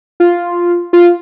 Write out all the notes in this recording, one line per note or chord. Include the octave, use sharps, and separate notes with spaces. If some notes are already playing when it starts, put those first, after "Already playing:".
F4
F4